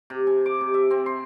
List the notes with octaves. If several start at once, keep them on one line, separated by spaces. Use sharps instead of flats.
C3
G#5
D6
C3
E5
C4
C6